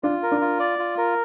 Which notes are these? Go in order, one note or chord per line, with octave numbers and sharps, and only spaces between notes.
D4 F4
A#4
D4
F4
D5
F4
A#4